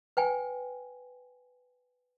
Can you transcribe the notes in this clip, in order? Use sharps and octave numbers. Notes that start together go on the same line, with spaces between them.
B4 G5 G#5